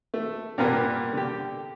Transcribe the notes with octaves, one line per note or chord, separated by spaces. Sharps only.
A3
G2 A#2 A#3 B3
D3 G4